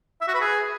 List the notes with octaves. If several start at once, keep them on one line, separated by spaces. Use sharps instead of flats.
E5
F#4
B4
G#4